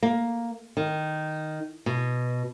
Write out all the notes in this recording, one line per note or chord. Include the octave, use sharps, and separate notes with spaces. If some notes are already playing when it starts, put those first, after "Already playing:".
A#3
D#3
B2